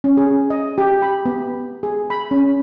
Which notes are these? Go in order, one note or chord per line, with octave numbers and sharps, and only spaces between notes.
C#4
G#4
D#5
G4
B5
B3
G#4
B5
C#4